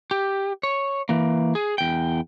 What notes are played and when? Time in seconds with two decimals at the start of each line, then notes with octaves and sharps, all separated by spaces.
0.11 G4
0.63 C#5
1.09 E3 A#3
1.55 G#4
1.78 E2 G5